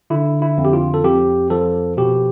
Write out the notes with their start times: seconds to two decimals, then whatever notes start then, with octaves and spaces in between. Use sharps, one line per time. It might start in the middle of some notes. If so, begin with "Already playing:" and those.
0.10 D3 E4
0.42 E4
0.58 F2
0.65 G4
0.73 F4
0.94 A4
1.04 F2 G4
1.50 F3 A4
1.97 B2 G4